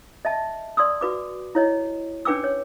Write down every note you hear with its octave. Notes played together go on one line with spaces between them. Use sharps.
D#5 E5 A5
D5 C6 D#6 E6
F#4 B4 D6
E4 C#5 D#5
C#4 D4 B4 G5 D6 E6
C#5